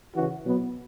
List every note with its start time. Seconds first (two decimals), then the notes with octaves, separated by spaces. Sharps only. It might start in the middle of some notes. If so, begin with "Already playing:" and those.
0.15 C#3 E3 C#4 F#4
0.44 B2 F#3 B3